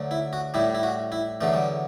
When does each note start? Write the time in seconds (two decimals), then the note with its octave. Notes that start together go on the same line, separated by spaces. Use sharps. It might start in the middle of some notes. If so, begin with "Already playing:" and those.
Already playing: D2 D3 F#3
0.11 E4
0.33 F#4
0.54 A2 G3 E4
0.74 E4
0.83 F#4
1.12 E4
1.41 E2 D3 F#3 A3
1.54 G3